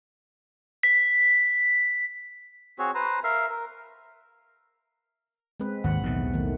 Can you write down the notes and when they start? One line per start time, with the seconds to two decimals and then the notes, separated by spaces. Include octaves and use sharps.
0.83 B6
2.79 C4 F#4 G#4 C#5
2.95 B4 C5 A#5
3.24 A#4 E5 F5
3.50 A#4
5.60 G#3 C4 B4
5.84 G#1 D#2 F#5
6.03 B1 E2 A2
6.34 D#3 A3